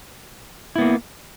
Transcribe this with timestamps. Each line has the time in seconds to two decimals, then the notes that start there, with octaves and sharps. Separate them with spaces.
0.76 E4
0.78 B3
0.81 A#3